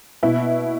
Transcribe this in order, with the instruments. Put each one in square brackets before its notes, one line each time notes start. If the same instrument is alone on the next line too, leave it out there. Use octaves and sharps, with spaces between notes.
[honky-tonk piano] B2 E4